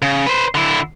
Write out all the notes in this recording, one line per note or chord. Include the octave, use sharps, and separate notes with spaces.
C#3
B4 C5
D3 E4